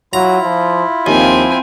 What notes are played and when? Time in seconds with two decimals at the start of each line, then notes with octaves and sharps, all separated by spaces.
0.13 F#3 E4 F4 A#5
0.43 F3
1.06 D#2 F3 C4 G#5